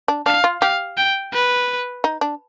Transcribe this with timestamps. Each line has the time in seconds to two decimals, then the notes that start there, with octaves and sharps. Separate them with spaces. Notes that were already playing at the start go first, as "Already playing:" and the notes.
0.08 D4
0.26 D4 F5
0.44 F4
0.61 G4 F5
0.97 G5
1.33 B4
2.04 D#4
2.21 D4